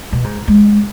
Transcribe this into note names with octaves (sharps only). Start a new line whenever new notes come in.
B2
G#2
G#3